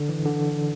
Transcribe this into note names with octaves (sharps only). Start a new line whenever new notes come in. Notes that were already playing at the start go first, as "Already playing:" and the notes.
Already playing: D3
E3
D3